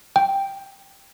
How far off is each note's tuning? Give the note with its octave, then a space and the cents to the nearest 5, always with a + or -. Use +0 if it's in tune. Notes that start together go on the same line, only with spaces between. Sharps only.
G5 +5